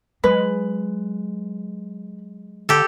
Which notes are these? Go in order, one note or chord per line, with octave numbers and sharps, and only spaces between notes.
F#3 G#3 B4
D3 G4 A4